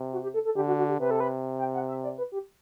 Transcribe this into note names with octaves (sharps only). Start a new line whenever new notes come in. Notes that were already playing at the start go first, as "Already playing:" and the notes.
Already playing: C3
F#4
G4
A4
A4
D3 G4
F#4
F#4
G4
C3 B4
A4
B4
G5
F#5
E5
D5
B4
G4